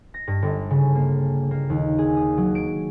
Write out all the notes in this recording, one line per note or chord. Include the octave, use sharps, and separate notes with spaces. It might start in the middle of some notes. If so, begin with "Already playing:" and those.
A#6
G2
G1
C#3
A#3
A#3
D#2
G#4
D#6
F#3
D7